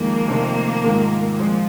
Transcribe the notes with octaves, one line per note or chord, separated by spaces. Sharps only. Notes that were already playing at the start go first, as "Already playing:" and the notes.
Already playing: F2 D#3 G#3 A#3
F2 C3 D#3 C4
G#2 D#3 G#3 F4 A#4
A#2 F3 G#3 C4 G#4